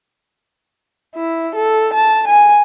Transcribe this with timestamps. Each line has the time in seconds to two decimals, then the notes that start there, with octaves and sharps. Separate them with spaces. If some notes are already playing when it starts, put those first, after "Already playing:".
1.16 E4
1.55 A4
1.94 A5
2.28 G#5